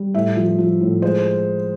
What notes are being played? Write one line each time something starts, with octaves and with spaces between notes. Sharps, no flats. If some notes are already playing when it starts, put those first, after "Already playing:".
Already playing: G3
A2 E5
F3
F3
A2
G#3 C5